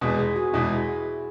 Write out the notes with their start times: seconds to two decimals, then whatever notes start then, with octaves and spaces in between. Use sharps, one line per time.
0.01 E2 B2 G#3 G#4
0.19 G#4
0.36 F#4
0.53 E2 B2 G#3 E4